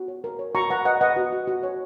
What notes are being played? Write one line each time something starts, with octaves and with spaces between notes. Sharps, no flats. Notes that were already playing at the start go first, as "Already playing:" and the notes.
Already playing: F#4
C#5
A#4
C#5
F#4 A#5 C#6
B4 F#5 A#5
B4 D#5 F#5
B4 D#5 F#5
F#4
F#4
F#4
C#5